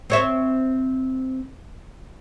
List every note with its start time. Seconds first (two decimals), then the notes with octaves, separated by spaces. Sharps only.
0.10 C4 C#5 E5